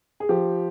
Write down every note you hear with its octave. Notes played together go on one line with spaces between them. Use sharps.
G#4
F3 G4